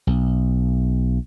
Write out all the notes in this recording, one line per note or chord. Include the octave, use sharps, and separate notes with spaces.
B1